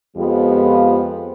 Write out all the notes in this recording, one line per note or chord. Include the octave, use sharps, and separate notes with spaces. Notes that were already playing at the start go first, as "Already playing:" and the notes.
F2 F3 G#3 B3 F4 G4